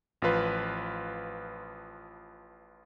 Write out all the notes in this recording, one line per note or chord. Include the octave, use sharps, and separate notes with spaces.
A1 F3 F4 B4